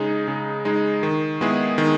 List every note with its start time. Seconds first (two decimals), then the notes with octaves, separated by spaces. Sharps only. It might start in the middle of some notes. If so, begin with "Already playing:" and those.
Already playing: C#3 G#3 D#4 G#4
0.28 C#3
0.65 G#3 D#4 G#4
1.03 D#3
1.41 G#3 B3 E4 G#4
1.78 D#3